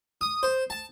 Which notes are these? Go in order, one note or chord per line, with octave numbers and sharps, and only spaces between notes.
D#6
C5
A5